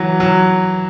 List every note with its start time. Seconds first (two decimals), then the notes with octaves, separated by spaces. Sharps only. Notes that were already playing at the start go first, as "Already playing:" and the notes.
Already playing: E3 F#3
0.20 F#3